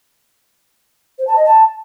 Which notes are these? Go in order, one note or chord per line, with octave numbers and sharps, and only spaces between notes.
C5
A5
D#5
A5